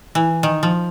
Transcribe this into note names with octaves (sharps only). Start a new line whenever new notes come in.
E3
D#3
F3